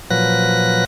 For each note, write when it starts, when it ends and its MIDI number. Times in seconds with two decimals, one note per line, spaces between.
0.11 0.85 46
0.11 0.85 53
0.11 0.85 54
0.11 0.85 71
0.11 0.85 90
0.11 0.85 94